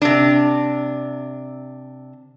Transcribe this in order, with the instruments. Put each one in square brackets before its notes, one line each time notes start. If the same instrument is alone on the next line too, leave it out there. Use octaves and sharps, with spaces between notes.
[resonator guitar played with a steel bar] C3 D4